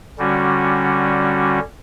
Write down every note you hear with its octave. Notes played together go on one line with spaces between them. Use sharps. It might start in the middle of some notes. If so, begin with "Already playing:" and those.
D3 G3 C#4 F#4